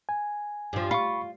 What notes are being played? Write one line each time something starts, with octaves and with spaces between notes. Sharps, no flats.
G#5
G2 F3
F4 B5 C#6